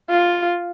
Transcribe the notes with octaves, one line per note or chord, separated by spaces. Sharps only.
F4